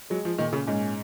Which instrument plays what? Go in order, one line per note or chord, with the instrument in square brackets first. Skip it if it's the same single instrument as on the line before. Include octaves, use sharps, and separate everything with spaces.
[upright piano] F#3 [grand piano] G#3
[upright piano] F3
[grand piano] A#2 [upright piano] D#3
[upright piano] C#3
[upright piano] G#2 [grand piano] C#4